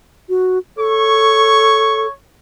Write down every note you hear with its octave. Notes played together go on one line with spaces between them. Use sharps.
F#4
A4 C#5 C#6